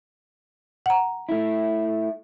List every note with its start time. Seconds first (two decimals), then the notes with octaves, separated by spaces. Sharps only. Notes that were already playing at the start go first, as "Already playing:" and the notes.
0.86 F#5 A#5
1.29 A3 E4